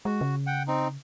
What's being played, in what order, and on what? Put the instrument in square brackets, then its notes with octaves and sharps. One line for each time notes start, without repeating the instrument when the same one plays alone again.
[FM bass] G#3 [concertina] F#4
[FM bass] C#3
[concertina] F#5 G5
C4 D#4